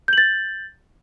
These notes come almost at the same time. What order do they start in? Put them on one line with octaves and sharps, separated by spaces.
G6 F#7 A6